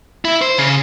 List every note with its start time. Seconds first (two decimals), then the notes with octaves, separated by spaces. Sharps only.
0.25 E4
0.42 C5
0.58 C#3